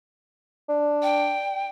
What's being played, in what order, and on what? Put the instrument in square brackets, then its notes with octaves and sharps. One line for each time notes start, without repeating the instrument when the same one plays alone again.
[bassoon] D4
[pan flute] G5